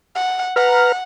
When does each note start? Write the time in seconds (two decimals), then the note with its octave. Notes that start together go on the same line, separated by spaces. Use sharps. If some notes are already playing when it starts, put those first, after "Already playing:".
0.15 F#5
0.56 B4 F#5 A#5 F6